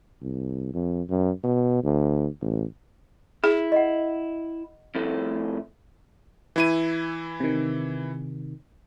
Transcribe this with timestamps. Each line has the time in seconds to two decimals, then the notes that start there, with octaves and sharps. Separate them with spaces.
0.22 C2
0.74 F2
1.09 F#2
1.44 B2
1.84 D2
2.42 A1
3.44 E4 G#4
3.72 D#5 F#5
4.95 F2 A2 A3
6.56 E3 E4 D#7
7.40 C3 D#3